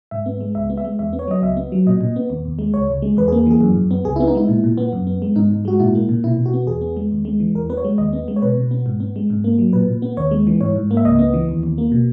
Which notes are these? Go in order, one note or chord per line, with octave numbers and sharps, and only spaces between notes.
G#2 E5
B3
G#3
C#2 E5
B3
E5
G#3
E2 E5
B3
C#5
F#3 D#5
C#2 E5
B3
F#3
A#2 D#5
A#2
B3
D#2
D#2
G#3
C#2 C#5
C#2
G#3
E2 B4
G#4
A#3
E3 G#4
F#2
F#2
B3
C#2 G#4
E4
B3
D#4
G#3 E4
A#2
A#2
B3
F#2
B3
G#3
G#2 D#4
G#2
G#3 F#4
A#2 E4
A#3
A#2
B2 E4
B2
F#4
B3
E2 G#4
B3
G#3
D#2
G#3
E3
E2 A#4
B3 B4
C#5
G#3
D#2 D#5
B3
G#3
C#5
B2 B4
B2
B3
G#2
B3
G#3
G#2
A#3
F#3
A#2 B4
A#2
B3
D#2 C#5
G#3
E3
G#2 C#5
G#2
A#3
E5
C#2 D#5
B3
E3
D#2
D#2
A#3
B2